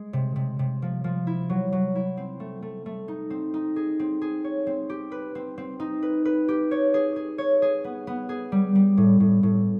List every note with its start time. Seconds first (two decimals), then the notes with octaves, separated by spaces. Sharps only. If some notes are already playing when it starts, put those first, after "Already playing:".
Already playing: G#3
0.13 C3
0.36 C3
0.59 C3
0.82 F3
1.04 F3
1.27 E4
1.50 F#3
1.72 F#3
1.95 E4
2.17 C4
2.40 A3
2.62 A3
2.86 A3
3.08 D#4
3.30 C4
3.54 D#4
3.76 G#4
4.00 C4
4.22 G#4
4.44 C#5
4.67 C4
4.90 G4
5.12 B4
5.35 C4
5.58 C4
5.80 D#4
6.03 B4
6.25 B4
6.48 G4
6.71 C#5
6.94 G#4
7.16 G#4
7.38 C#5
7.62 G#4
7.84 B3
8.07 B3
8.29 G#4
8.52 G3
8.75 G3
8.97 A2
9.20 A2
9.43 A2